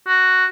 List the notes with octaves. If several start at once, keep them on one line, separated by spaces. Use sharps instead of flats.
F#4